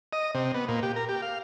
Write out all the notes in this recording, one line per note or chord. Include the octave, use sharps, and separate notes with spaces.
D#5
C3
B3
A#2
G4
A#4
G4
F5